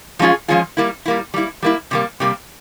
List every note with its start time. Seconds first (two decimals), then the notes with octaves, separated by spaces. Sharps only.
0.19 F3 G#3 C#4 F4 G#4
0.48 F3 G#3 C#4 F4 G#4
0.77 G3 A#3 E4
1.06 G3 A#3 E4
1.34 G3 A#3 E4
1.63 G3 A#3 E4
1.91 C3 G3 A#3
2.20 C3 G3 A#3